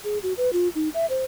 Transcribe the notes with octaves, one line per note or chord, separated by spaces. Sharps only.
G#4
F#4
B4
F4
D#4
E5
C5